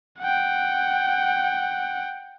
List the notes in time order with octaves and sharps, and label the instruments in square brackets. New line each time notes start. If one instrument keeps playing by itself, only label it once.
[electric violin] F#5 G5